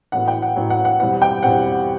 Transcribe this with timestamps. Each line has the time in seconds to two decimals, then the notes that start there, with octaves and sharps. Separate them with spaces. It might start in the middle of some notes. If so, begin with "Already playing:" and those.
0.12 A1 A2 F#3 B3 F#5
0.28 G5
0.42 F#5
0.56 A1 A2 F#3 B3
0.70 F#5
0.85 F#5
1.00 E2 B2 G3 C4 F#5
1.22 G5
1.43 E2 B2 G3 C4 F#5